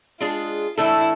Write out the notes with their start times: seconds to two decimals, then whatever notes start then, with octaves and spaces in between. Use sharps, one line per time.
0.20 G#3 D4 F4 G#4
0.77 E3 A3 D4 E4 A4